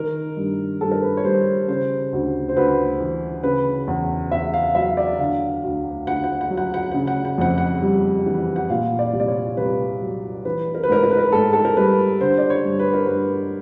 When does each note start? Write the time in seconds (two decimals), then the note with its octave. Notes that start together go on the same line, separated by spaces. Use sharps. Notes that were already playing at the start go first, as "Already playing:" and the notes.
Already playing: D#3 A#4
0.37 G2
0.81 G2 A4
0.91 A#4
1.02 B4
1.17 C#5
1.24 G3 C5
1.68 C#3 C5
2.13 D2
2.49 C5
2.56 D2 B4
3.00 E3
3.43 C#3 B4
3.87 E2
4.32 E2 E5
4.54 F5
4.75 F#3 E5
4.97 D5
5.19 D3 F5
5.64 D2
6.07 D2 F#5
6.24 F#5
6.41 F#5
6.50 F#3
6.57 F#5
6.74 F#5
6.91 C#3 F#5
7.07 F#5
7.25 F#5
7.38 F2 F#5
7.58 F#5
7.82 G3
8.26 E3
8.56 F#5
8.70 A#2 F5
8.99 D5
9.13 C2
9.20 D5
9.28 C#5
9.57 C2 B4
10.01 F#3
10.45 E3 B4
10.75 A#4
10.83 B4
10.89 G#2 A#4
11.03 A#4
11.11 B4
11.19 A#4
11.32 G#2 A4
11.53 A4
11.65 A#4
11.77 G3 B4
12.21 D3 C5
12.38 D5
12.50 C#5
12.65 G2
12.79 B4
12.94 A#4
13.07 G2 B4